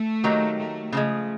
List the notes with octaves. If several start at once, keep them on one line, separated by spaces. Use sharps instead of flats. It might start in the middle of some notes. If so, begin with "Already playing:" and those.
Already playing: A3
D#3 F#3 A#3 D#4 G4
A3
C#3 F3 G#3 A3